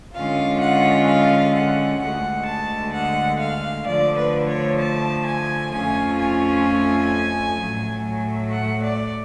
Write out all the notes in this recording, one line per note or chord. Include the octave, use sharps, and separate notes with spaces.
D3 G#3 C#4 F4 F5
F#5
F5
F#5
D2 D3 G#3 F#5
A5
F#5
F5
D3 F3 A3 D5
B4
C#5
A5
G#5
F2 F3 A3 C#4 F4 G#5
G#5
A2 F#3 A3
F#5
D5